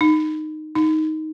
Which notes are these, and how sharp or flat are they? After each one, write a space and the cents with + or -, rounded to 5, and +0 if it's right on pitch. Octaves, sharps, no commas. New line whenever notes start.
D#4 -10
D#4 +10